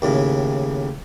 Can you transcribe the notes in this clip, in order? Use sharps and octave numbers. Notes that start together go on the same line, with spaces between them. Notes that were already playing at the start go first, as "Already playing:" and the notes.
D#2 A2 C#3